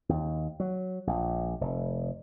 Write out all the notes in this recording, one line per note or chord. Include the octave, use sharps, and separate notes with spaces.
D#2
F#3
A#1
F1